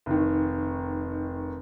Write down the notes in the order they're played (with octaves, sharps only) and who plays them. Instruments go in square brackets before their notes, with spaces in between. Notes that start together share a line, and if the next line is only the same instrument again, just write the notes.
[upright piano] F1 D#3